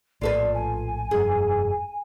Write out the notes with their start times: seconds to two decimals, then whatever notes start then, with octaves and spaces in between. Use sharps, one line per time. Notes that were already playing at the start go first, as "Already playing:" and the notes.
0.21 A#1 A2 F4 A4 B4 D5
0.54 G#5
1.11 F1 G2 G#4